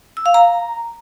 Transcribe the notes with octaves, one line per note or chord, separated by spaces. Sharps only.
E6
F5
A#5